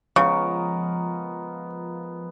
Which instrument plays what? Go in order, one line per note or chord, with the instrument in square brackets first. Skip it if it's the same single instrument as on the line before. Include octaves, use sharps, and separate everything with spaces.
[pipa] C#3 [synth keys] F3 [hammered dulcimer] G#3 B3 A#4 [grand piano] C#6